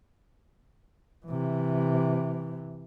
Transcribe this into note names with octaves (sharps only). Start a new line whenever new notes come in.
C3 E3